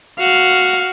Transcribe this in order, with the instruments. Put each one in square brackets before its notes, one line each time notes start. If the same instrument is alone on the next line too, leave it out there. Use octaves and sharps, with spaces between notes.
[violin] F#4 [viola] F5